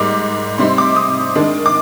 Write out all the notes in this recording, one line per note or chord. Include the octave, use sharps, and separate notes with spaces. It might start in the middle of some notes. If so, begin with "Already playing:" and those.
Already playing: G#2 G3 A#3 D6
C3 G3 C4 D#4 C6
D6
D#6
D#3 G#3 D4
D6